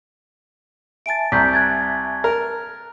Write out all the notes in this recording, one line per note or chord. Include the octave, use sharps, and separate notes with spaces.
E5 G#5 A5 A6 D7
C2 A#5 G6 B6
F#6 G#6 A6
A#4